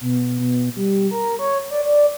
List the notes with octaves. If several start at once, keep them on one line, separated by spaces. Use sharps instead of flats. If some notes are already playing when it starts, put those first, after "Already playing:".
B2
B2
G3
A#4
C#5
D5
D5